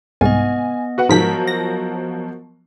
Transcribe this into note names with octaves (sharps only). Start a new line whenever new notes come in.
C2 G#2 B3 D#5 G#5
F#4 B4 F#5
G#2 F3 F#3 A#4 B6
A#6